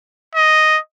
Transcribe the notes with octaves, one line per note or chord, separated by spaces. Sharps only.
D#5